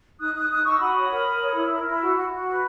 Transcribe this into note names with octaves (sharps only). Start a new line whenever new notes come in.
D#4 D#6 F#6
D#4 D#6 F#6
D#4 D#6 F#6
D#4 C#6 E6
F#4 B5 D#6
C#5
A#4
A#4
C#5
E4
A#4
E4
F#4
F#4
F#4
B4